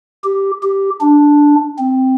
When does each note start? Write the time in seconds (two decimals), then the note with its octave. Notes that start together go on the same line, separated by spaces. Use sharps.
0.24 G4
0.63 G4
1.01 D4
1.79 C4